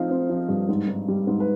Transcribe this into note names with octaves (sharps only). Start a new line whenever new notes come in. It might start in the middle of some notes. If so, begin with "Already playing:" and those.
Already playing: F3 C4 D#4 F5
C4
F3
G2
G#2
G#2
G3
G#2
B4